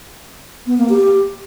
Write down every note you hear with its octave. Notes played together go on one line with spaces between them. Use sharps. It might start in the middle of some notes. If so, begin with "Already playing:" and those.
B3
A#3
G4